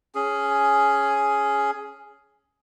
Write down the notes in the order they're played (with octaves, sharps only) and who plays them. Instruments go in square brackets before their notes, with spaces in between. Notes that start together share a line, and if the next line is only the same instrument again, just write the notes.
[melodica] C#4 G#4